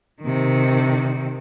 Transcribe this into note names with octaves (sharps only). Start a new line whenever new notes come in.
C3 D#3